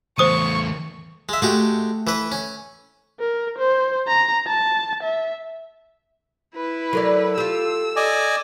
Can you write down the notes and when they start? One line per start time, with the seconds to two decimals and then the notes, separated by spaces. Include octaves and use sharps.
0.18 E2 A3 C5 C#6 D#6 D#7
1.29 G#3 E5
1.42 G#3 A3 F#4 G4
2.07 E3 B4
2.32 C#4
3.20 A#4
3.58 C5
4.08 A#5
4.47 A5
5.03 E5
6.56 E4 B4
6.93 F#3 A4 A#4 D5
7.38 F4 G4 E6
7.96 D5 D#5 G#5